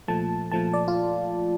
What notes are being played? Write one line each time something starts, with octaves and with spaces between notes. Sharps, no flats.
A#2 F3 A3 A5
A#2 F3 A3 A5
D5
F4